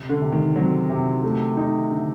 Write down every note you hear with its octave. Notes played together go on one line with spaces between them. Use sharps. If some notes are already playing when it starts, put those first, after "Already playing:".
Already playing: C3
D3
C3
D#3
F#3 C4
C3
A3
D#4
D3